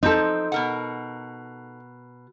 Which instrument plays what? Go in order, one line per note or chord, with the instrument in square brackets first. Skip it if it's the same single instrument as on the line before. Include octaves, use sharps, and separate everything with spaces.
[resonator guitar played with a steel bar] F3 C4 [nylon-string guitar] D#4 A4
[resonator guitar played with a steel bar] B2 A#4 F#5